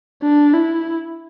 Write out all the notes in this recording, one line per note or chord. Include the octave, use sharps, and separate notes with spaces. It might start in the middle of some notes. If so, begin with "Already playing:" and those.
D4
E4